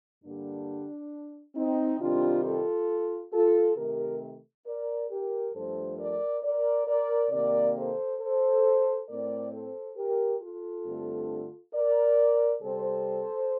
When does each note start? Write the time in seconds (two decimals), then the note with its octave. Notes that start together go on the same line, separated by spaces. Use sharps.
0.23 G2 D3 G3 A#3 D4
1.55 C4 D#4
2.00 C3 D#3 G3 C4 D4 F4
2.44 F4 A4
3.32 F4 A4
3.77 C3 D#3 A3 G4 A#4
4.66 A#4 D5
5.10 G4 A#4
5.54 G2 F3 A3 A4 C5
5.98 A#4 D5
6.43 A#4 D5
6.87 A#4 D5
7.31 C3 D#3 A#3 A#4 D5
7.75 A4 C5
8.20 A4 C5
9.08 A2 A3 C4 A#4 D5
9.52 A4 C5
9.97 G4 A#4
10.40 F4 A4
10.86 G2 D3 A3 C4
11.74 A#4 D5
12.62 C3 G3 C4 A4 C5